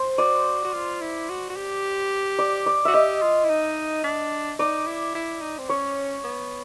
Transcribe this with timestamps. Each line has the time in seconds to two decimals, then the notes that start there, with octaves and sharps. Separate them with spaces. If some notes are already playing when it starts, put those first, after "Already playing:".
Already playing: C5
0.18 F#4 D5
0.65 F#4
0.73 F4
1.01 E4
1.29 F#4
1.50 F#4
1.56 G4
2.39 D5
2.66 D5
2.85 F#4 E5
2.94 G4 D#5
3.22 F4
3.44 E4
3.50 D#4
4.04 D4
4.59 D#4 D5
4.87 E4
5.15 E4
5.42 D#4
5.58 C4
5.69 C#4 C#5
6.24 B3